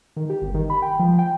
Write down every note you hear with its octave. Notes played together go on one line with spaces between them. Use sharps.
D#3
G4
G1
D#3
B5
G5
F3
G5